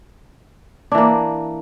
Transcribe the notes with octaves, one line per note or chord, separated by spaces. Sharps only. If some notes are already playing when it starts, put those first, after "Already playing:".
E3 A#3 D4